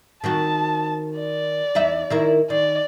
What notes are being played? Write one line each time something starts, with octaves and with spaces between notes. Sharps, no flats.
D#3 C4 F#4 A5
D5
E2 D#4 E5
D#3 E4 A#4
D#3 D5